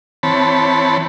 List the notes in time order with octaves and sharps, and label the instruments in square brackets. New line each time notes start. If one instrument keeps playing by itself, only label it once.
[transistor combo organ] E3 C4 C#5 A5 B5